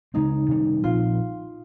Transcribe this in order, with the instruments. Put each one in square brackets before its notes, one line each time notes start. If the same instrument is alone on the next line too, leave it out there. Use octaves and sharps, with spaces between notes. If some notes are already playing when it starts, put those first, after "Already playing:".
[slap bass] C#3 G#3 C4 [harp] D#4
[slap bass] C3 D#3 G3 C#4
[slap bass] A#2 F3 C4 [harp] F4